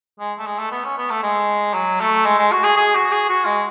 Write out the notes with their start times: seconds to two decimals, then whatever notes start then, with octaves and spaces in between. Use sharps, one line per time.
0.20 G#3
0.38 A3
0.46 G#3
0.59 A3
0.71 B3
0.84 C#4
0.97 B3
1.10 A3
1.23 G#3
1.74 F#3
2.00 A3
2.25 G#3
2.38 G#3
2.52 F#4
2.63 G#4
2.77 G#4
2.95 F#4
3.12 G#4
3.29 F#4
3.45 G#3